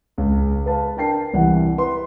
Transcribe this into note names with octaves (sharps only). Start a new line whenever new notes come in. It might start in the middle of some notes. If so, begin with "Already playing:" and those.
C#2
B4 F5 A5
D4 A#4 G5 A5 C7
C2 E3 F#5
B4 C6